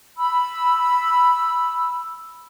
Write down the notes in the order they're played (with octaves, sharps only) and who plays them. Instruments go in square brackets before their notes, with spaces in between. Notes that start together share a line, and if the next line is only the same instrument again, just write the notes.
[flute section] B5 E6